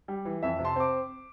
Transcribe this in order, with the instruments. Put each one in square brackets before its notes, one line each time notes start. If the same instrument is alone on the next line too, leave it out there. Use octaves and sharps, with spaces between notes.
[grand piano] G3
E3
F2 E5
C3
A5 C6
C4 D6